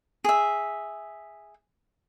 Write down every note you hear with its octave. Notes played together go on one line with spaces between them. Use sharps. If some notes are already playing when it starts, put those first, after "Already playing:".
G#4 E5